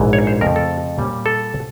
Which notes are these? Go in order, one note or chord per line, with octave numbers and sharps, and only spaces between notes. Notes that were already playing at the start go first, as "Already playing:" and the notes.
Already playing: A#1 G#2 E3
C#5
C5
F2 C#3 F3 A3 A#4
A4
A#2 G3 A#3 C#4
A4